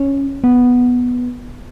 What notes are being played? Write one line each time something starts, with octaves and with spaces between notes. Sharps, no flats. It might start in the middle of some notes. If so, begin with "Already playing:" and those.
Already playing: C#4
B3